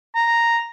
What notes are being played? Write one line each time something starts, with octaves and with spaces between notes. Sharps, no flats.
A#5